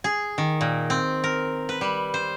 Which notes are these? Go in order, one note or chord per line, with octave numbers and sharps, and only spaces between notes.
G#4
D#3
A#2
C4
A#4
B4
G3
C5